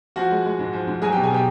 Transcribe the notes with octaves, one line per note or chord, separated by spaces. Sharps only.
F3 F#4 F#5
G#3
G#3
G#2
F3
G#2
F#3 G#4 G#5
G4 G5
B2
G#4 G#5
B2 G4 G5